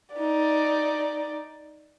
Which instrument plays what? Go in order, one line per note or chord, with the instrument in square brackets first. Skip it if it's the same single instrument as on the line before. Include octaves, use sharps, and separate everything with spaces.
[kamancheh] D#4 D5